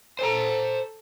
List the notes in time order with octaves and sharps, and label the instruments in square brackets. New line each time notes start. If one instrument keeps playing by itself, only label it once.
[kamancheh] A4 [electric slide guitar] C5 A#5